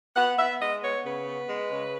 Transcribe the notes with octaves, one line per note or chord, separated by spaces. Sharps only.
B3 F#5
B3 E5
G#3 D#5
B3 C#5
C#3 B4
B3
G#3
C#3